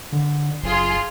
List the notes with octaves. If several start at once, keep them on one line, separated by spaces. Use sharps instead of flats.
D3
F#1 F4 G#4 C6